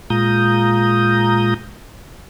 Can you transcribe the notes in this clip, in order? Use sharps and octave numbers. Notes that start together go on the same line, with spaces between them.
A#2 G#3 F4 A#5 D#6 G6